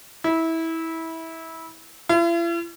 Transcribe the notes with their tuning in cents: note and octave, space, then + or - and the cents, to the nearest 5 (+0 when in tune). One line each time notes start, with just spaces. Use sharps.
E4 -20
E4 +45